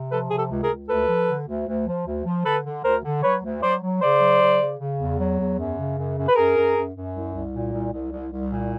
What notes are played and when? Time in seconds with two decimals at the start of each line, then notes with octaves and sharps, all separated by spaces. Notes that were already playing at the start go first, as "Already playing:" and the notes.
Already playing: C3
0.10 F3 A4 B4
0.29 C3 G#4
0.36 G4 A4
0.50 C#2
0.62 G#4 A#4
0.69 C#2
0.88 D2 A4 B4
1.09 F3
1.27 D3
1.47 D2
1.67 D2
1.87 F3
2.06 D2
2.25 F3
2.45 D3 A4 B4
2.65 D3
2.84 D2 A#4 C5
3.04 D3
3.23 F#3 B4 C#5
3.43 D2
3.62 F#3 C5 D5
3.83 F#3
4.01 C#3 C5 D5
4.20 F#3
4.41 C#3
4.60 C#3
4.80 C#3
4.99 E2
5.19 F#3
5.38 E2
5.58 F#2
5.78 C#3
5.97 F#2
6.17 F#2
6.29 B4
6.36 F#2 G#4 A#4
6.56 F#2
6.75 F#2
6.95 F#2
7.14 C2
7.34 C2
7.53 A#2
7.72 C2
7.93 C2
8.12 C2
8.32 C2
8.51 A#2